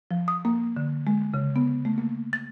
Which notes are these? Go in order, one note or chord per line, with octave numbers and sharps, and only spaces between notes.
F3
D#6
A#3
D3
G#3
C#3
B3
A3
A#3
A6